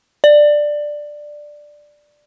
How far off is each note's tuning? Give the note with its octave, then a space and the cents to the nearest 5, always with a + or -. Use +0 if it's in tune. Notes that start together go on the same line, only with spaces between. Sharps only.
D5 +5